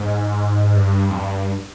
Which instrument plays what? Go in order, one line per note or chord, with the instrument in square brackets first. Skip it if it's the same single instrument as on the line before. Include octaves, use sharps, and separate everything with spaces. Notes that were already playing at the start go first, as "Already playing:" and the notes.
Already playing: [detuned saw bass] G#2
G2
F2
G2